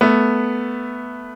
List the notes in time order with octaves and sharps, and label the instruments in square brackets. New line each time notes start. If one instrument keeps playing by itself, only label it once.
[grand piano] A3 B3